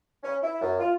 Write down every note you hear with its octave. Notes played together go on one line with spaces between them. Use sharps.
C#4
E4
F#2
F4